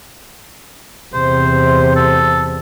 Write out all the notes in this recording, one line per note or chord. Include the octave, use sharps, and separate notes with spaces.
E2 C3 C5
A4